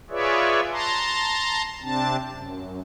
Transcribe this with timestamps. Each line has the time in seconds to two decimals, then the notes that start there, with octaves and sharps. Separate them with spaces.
0.10 F4 G#4 B4 C#5 D5 E5
0.71 A5 A#5 C6
1.82 C3 C4 D4 A5
2.31 F#2